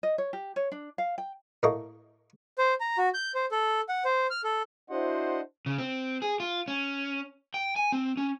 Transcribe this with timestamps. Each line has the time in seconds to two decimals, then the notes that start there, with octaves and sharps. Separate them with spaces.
0.03 D#5
0.18 C#5
0.33 G4
0.56 C#5
0.72 D4
0.98 F5
1.18 G5
1.63 A2 A3 A#3 A4 D#5 C#6
2.58 C5
2.80 A#5
2.98 F#4
3.14 G6
3.35 C5
3.51 A4
3.89 F#5
4.05 C5
4.30 F6
4.44 A4
4.90 D4 E4 F#4 C5 D#5 F#5
5.66 C#3
5.78 C4
6.22 G#4
6.40 F4
6.68 C#4
7.54 G5
7.76 G#5
7.92 C4
8.17 C#4